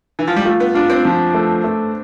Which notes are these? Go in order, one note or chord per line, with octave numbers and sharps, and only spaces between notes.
E3
F3
G3
A3 F4
B3
D4 F4
C4
F3
A3
A3